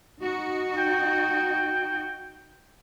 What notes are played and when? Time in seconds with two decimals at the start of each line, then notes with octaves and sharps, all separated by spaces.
0.20 D#4 F#4
0.78 G5